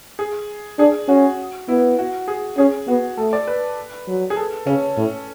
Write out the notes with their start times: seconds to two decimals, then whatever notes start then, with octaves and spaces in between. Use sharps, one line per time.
0.19 G#4
0.79 D4 G#4
1.08 C#4 F#4
1.68 B3 E4
1.99 F#4
2.28 G#4
2.58 C#4 G#4
2.88 B3 F#4
3.17 A3 A4
3.33 D5
3.47 B4
4.08 F#3
4.30 G#4
4.36 A4
4.66 C#3 C#4
4.97 A2